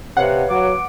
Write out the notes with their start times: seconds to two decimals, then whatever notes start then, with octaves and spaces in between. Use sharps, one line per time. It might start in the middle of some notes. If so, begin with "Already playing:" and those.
0.17 C3 B4 C#5 F5 F#5
0.50 F#3 D6